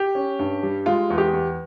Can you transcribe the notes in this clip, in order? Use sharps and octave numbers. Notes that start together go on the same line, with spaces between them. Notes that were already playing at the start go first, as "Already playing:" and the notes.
Already playing: G4
C#4
G2
G3
G#3 F4
E2
G4
E2